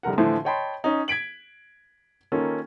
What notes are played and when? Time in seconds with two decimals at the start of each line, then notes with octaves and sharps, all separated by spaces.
0.03 F1 C2 D3 A#4 F#5
0.18 A2 D3 E3 F3
0.45 C#5 D#5 G5 A5 B5 C6
0.84 C#4 D#4
1.08 G#6 B6 D7 F#7
2.32 D#3 A#3 C#4 F4 A4